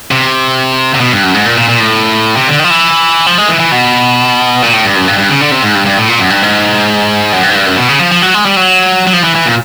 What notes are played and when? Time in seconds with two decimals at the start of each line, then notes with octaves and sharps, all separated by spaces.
0.11 C3
0.94 C3
1.01 B2
1.12 G2
1.23 F#2
1.34 G#2
1.46 A#2
1.58 A#2
1.69 A#2
1.80 A2
2.36 C3
2.48 D3
2.59 D#3
2.64 F3
2.70 E3
3.26 F3
3.38 G#3
3.48 E3
3.60 E3
3.72 B2
4.62 A#2
4.73 A2
4.85 G2
4.95 F#2
5.07 G2
5.18 G2
5.30 C#3
5.41 D3
5.51 C3
5.63 G#2
5.75 G2
5.86 G2
5.98 A2
6.08 A#2
6.19 F#2
6.30 G2
6.42 G#2
7.33 F#2
7.43 G2
7.50 G#2
7.55 G2
7.66 F#2
7.77 B2
7.89 C#3
7.99 F3
8.11 F3
8.22 F#3
8.34 G#3
8.45 G3
8.56 F#3
9.07 F#3
9.13 F3
9.24 E3
9.35 E3
9.46 A#2